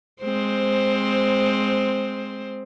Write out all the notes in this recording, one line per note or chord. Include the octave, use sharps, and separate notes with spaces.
G#3 C4 C5